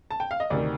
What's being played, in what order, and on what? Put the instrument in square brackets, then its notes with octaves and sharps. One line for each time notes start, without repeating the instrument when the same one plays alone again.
[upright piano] A5
G5
F5
D#5
D2 C3 D#3 D5